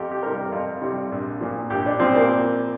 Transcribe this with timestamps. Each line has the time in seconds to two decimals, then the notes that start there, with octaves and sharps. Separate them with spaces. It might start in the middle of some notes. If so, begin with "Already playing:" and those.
Already playing: F2 G4
0.12 G4
0.23 C3 G3 A#4
0.52 F2
0.82 C3 G3
1.12 A#1
1.40 A#2 F3
1.70 A#1 G4
1.86 D4
2.00 A#2 F3 C4
2.15 A#3